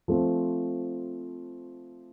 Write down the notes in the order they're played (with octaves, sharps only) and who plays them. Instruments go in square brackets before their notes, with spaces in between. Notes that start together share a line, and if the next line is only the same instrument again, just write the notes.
[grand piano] F3 A3 C4